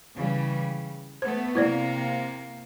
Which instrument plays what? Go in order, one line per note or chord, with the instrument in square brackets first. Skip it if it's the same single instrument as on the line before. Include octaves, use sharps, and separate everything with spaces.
[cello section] C#3 E3 G3
[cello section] A3 B3 [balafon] C5
[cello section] C3 A#3 [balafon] E4 C5 D5